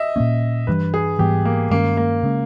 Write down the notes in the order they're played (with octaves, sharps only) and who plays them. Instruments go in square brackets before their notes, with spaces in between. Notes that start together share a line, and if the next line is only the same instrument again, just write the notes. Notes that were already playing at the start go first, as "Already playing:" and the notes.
Already playing: [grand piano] D#5 E5
[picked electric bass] A#2 A#3 C#4
[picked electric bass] G2 E3 G3 [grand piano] B4
[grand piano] G#4
[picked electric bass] G#2 E3 G3 B3 [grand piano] G4
[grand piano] A#3
[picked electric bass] G2 D#3 G#3 C#4 [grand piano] A#3
[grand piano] A#3
[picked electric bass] C#3 G#3 C#4